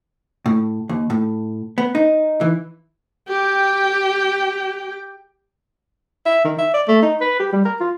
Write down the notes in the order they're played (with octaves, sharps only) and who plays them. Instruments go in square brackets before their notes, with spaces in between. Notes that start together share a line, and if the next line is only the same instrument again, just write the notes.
[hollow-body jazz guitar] A2
D#2
A2
B3
D#4
E3
[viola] G4 G5
[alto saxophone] E5
D#3
E5
D5
A3
D#4
B4
G4
G3
A#4
F4